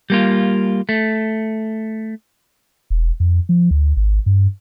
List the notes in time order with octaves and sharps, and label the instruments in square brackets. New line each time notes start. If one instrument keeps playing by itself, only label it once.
[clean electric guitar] G3 A#3 F4
A3
[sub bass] E1
F2
F3
D2
G#1
G2